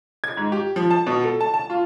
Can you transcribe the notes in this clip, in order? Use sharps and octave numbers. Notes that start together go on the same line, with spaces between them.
G#6
G#2
G4
F3
A5
B2
A4
A5
A5
F4